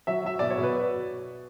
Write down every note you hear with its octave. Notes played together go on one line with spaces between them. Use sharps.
F#3 E5
F#3 E5
B2 D5
C#5
B2
B4